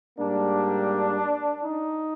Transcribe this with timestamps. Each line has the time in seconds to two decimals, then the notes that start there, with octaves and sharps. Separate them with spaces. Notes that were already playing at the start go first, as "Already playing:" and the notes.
0.19 G#2 G3 A#3 D4
1.63 D#4